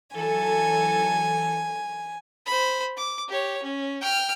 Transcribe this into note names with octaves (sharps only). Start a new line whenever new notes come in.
E3 F#3 A4 G#5
C5 B5
D6
G4 C#5
C#4
G5 F6